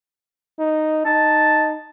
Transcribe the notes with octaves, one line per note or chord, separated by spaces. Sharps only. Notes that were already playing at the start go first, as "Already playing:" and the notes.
D#4
D#4 A5